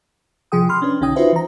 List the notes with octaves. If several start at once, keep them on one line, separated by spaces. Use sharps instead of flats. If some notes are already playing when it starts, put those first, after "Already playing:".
A1 C3 F3 G#4 G5 D#6
B5 C6 F6
C#4 D4 B4
B1 D3 C#4 D#4 G5 D#6
D#4 F4 F#4 B4 C5 E5
E3 A#5